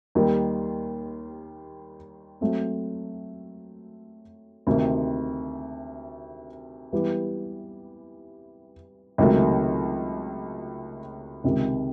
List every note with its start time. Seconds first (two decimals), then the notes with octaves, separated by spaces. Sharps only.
0.15 D#2 D#3 G3
2.41 F#3 A3 C4
4.67 D2 C3 D#3
6.93 E3 G3 B3 E4 G4
9.18 C#2 C3 D#3 F#3 A3
11.44 C#2 C3 D#3